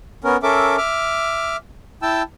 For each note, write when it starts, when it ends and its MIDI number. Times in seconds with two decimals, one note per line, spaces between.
0.24 0.37 59
0.24 0.37 61
0.24 0.37 70
0.43 0.77 61
0.43 0.77 69
0.43 0.77 70
0.43 0.77 76
0.43 0.77 86
0.78 1.56 76
0.78 1.56 86
0.78 1.56 89
2.02 2.22 64
2.02 2.22 79
2.02 2.22 81
2.02 2.22 88